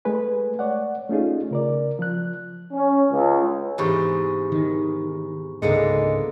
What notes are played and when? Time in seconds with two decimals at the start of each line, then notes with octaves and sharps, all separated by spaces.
0.05 G#3 A3 B4 G#5
0.59 C#5 D5 F#5
1.09 A3 C#4 D#4 F4 G#4
1.51 C#3 A#4 D5
1.99 F3 F#6
2.72 C#4
3.10 C#2
3.78 E2 G#2 C3 G4 B5 C#6
4.52 D#3
5.62 C#2 G#2 D3 G#3 A#3 B3 C#7